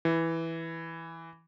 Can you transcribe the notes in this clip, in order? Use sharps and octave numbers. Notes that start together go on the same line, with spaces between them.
E3